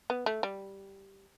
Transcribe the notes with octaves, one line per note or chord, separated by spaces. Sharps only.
B3
A3
G3